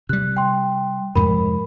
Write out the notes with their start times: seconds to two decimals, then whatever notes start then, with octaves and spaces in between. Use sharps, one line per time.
0.09 C3 G3 F#6
0.37 G5 C6
1.15 F2 G#2 C3 A#4 B5